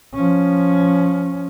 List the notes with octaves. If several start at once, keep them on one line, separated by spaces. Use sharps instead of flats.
F3 C#4